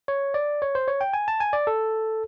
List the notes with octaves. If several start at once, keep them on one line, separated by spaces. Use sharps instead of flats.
C#5
D5
C#5
C5
C#5
G5
G#5
A5
G#5
D5
A4